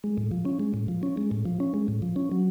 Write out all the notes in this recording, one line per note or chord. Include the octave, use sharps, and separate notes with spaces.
G#3
A2
F3
C#4
G#3
A2
F3
C#4
G#3
A2
F3
C#4
G#3
A2
F3
C#4
F#3